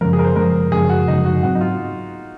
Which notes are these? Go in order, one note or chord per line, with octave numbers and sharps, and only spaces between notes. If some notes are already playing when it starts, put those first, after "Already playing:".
F#2 C#3 F3 G#3 A#4
G#4
A#4
C5
F#2 C#3 F3 G#3 A#4
F#2 C#3 F3 G#3 G#4
F#4
F#2 C#3 F3 G#3 D#4
F#4
G#2 F#3 C4 F#4
D#4
F4